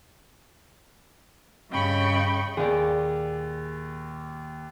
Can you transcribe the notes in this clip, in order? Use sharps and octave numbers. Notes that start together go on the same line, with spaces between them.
G2 C#3 D#5 G5 B5 C#6
D#2 A#2 G#4 D5